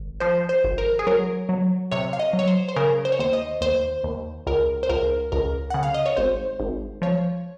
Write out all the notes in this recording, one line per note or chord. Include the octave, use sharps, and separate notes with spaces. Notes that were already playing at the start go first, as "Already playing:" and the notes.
Already playing: G#1
F3 C5
C5
G#1
A#4
G#4
F#3 A#4
F#3
C3 C#5
F5
D#5
F#3
C#5
C5
C5
C#3 A#4
C5
C#5
D#2 C5
D#5
D#2 C5
D#2
C#2 A#4
C5
C#2 A#4
C#2 A#4
C#3 F#5
F5
D#5
C#5
G#1 C5
G#1
F3 C#5